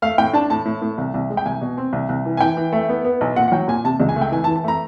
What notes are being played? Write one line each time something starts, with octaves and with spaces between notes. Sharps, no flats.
A3 F5
A2 G5
D4 A5
A2 A5
A2
A2
C2
C2
G#3
G5
C2 G#5
B2
C4
C2
C2
E3
G#5
E3 G5
E3
A3
B3
B3
B1
A#2 F#5
F#5
F#3 G5
A#2 G#5
C3 A5
C#2
G#5
A3
G5
E3 G#5
A5
E3
A5
A3 A#5